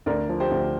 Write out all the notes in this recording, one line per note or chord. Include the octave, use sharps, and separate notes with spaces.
D2 A#4 D5
F3
G4 C5
D2